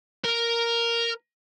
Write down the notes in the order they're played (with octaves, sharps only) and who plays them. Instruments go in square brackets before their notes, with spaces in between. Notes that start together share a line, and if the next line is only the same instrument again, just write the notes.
[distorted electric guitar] A#4